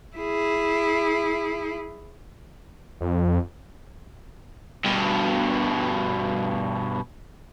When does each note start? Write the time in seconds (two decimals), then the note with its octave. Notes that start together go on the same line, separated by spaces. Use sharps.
0.17 E4 G#4
3.01 F2
4.86 G2 B2